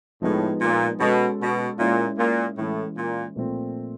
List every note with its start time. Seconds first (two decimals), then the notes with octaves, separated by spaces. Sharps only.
0.22 A2 F3 G#3 B3 D#4 G#4
0.61 A#2
1.00 B2 G#3 C#4 F#4 A4
1.40 B2
1.78 A#2 G#3 C#4 E4
2.18 A#2
2.57 A2 E3 G#3 C#4
2.96 A#2
3.36 A#2 F3 A3 C4